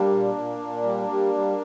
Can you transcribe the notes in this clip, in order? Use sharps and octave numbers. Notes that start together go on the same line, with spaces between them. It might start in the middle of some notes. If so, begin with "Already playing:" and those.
Already playing: G3 A#3 D4
A#2
A#2
A#2
G3
G3
G3